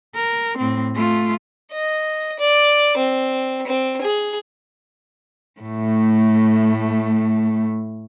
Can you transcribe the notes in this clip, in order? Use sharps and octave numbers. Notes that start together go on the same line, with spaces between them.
A#4
A2 C4
A3 F4
D#5
D5
C4
C4
G#4
A2 A3